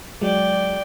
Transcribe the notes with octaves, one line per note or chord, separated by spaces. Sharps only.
F#3 G#3 D5 G5